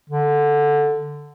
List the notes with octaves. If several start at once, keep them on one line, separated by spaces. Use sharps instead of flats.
D3